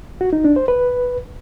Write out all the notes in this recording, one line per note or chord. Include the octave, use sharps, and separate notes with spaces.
F#4
D#4
D4
C5
B4